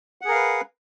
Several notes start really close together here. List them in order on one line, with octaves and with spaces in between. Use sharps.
F#5 G#4 A#4 F5 B4